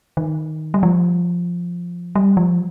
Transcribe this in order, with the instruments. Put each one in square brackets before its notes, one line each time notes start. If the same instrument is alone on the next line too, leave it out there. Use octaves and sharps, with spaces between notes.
[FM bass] D#3
G3
F3
G3
F3